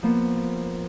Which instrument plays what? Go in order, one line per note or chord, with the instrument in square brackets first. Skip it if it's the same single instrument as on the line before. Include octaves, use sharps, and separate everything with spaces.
[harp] F3 A#3 B3